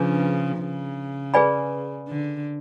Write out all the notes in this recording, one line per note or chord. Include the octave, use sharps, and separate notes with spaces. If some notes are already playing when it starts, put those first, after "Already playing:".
Already playing: C#3 F3 D4 G#4 B4
C#3
G#4 B4 D5 G#5 B5
D3